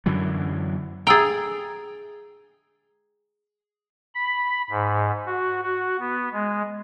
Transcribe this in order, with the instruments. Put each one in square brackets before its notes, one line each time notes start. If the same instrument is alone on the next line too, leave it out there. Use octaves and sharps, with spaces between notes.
[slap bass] F#2 D3 E3 F#3
[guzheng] G#4 G5 [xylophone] A#5 E6 A6
[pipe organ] B5
G#2
F#4
F#4
B3
G#3